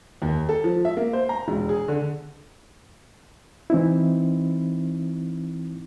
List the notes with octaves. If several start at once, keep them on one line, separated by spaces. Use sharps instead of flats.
D#2
A4
F3
E5
A#3
C5
A#5
E1
G#4
D3
E3 C4 D#4 E4